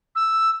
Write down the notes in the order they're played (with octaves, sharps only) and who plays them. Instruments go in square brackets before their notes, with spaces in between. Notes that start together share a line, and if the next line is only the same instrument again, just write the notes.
[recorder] E6